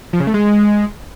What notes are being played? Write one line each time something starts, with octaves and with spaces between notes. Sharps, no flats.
F3
C#3
A3
G#3